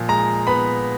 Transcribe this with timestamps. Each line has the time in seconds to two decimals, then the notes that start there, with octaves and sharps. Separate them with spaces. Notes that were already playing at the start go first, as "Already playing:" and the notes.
Already playing: A#2 F3
0.08 G#3 A#5
0.47 B3 B5